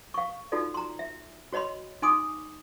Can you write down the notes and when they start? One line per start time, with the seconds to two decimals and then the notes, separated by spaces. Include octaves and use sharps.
0.14 F5 C#6
0.52 D#4 F4 F#4 A4 D5
0.74 A#5 C6
0.99 E5
1.53 F#4 C#5 D#5 B5 C6
2.02 D#4 G#5 C6 D6 D#6